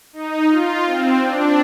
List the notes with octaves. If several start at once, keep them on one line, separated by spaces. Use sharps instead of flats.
D#4
F4
C4
D4